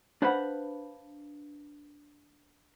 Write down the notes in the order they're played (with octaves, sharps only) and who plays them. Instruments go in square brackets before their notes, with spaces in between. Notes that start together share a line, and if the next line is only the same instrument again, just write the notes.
[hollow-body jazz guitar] D4 B4 C5 F5 F#5 B5